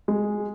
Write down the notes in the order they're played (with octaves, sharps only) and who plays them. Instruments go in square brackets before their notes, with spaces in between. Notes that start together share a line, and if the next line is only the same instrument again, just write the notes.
[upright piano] G#3